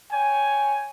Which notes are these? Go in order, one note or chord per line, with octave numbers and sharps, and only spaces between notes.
C#5 G5 G#5